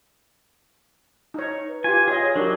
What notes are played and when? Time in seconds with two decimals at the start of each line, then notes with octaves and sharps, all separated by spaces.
1.34 D#4 C#5
1.69 B4
1.84 F4 G4 G#5
2.08 F4 G#4 C#5 D#5
2.36 F#3 D4 D#4 G4 A#4